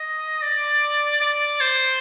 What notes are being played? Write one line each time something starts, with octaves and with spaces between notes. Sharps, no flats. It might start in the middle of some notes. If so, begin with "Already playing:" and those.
Already playing: D#5
D5
D5
C5